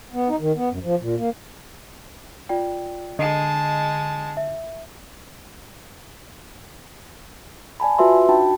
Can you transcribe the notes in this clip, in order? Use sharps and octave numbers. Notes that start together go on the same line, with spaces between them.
B3
D#4
D#3
B3
F#2
F3
A#2
A#3
F4 D5 G5
D3 G#3 D#5 A5 C7
E5
D5 G#5 A5 B5
F4 F#4 B4 E5 C6
D4 D#4 F#4 G5 A5 B5